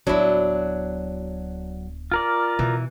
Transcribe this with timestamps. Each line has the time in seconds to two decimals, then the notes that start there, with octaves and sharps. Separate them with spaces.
0.07 D1 F#3 B3 D4 E4
2.12 F4 A#4 D5
2.59 B2 E3